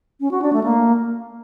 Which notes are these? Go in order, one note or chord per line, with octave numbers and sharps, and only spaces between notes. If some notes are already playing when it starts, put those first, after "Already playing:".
C#4
F#4
D4
A3
A#3